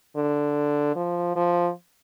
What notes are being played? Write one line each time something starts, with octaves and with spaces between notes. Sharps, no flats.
D3
F3
F3